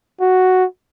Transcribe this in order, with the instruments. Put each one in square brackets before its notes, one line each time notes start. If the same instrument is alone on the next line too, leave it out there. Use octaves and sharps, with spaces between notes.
[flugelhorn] F#4